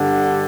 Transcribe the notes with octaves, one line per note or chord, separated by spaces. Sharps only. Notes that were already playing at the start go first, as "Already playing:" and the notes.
Already playing: G2 D3